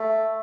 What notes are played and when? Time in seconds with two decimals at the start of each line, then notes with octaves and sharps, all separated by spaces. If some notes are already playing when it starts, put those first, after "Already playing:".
Already playing: A3